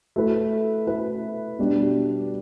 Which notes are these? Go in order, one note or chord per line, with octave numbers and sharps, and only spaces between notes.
A3 E4 B4
A3 E4 B4
B2 G3 D4